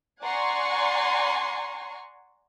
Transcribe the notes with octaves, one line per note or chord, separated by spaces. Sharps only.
D5 F#5 G#5 A#5 C6 C#6